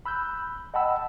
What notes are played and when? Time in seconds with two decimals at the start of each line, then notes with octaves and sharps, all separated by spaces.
0.06 B5 E6 F#6 G6
0.74 D#5 F#5 G5 A5 B5 E6